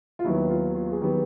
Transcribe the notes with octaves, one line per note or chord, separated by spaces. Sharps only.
F4
D#2 D#3 F#3 B3 E4
F4
F4
G#4
D#3 F#3 B3 G4